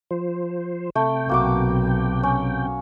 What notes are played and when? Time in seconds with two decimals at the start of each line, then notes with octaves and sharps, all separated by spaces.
0.11 F3 C5
0.96 C3 A3 G5
1.29 B1 A#3 F#4 D6
2.23 C#4